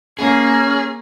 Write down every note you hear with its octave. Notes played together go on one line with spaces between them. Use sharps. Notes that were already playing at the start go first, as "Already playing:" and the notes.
A#3 C#4 G#4